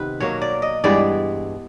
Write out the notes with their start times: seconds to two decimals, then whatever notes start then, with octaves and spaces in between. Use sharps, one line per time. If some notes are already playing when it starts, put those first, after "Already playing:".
Already playing: C3 D#3 B3 B4
0.20 B2 F#3 A#3 C#5
0.42 D5
0.62 D#5
0.84 G2 E3 G#3 B3 D5